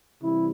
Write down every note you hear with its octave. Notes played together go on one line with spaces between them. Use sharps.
C3 E3 G3 E4